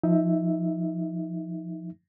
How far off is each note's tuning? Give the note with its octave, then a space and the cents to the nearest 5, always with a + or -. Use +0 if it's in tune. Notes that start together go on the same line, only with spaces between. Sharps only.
F3 +0 D#4 +25 E5 +0